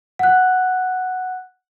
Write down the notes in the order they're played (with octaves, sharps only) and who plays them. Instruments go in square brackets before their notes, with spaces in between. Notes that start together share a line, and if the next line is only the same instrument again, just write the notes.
[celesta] F#5 F#6